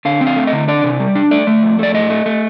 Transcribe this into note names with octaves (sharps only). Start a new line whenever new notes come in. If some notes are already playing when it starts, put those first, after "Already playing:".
D3 F5
C4
F5
A3
D#5
D3
D4 D5
C3
G3
D4
A3 D5
A3
F2
A3 D5
A2 D#5
A3
A3